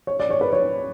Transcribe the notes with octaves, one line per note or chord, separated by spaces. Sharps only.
C#5
D5
C#5
B4
C#5